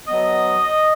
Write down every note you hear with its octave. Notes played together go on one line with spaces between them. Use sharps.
B2 F#3 B3 D#5